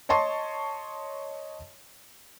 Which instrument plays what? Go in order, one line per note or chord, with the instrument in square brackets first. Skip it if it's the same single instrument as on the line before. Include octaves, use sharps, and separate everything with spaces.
[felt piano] C#5 D#5 A5 C6 C#6